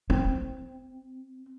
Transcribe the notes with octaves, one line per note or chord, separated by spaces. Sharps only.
C4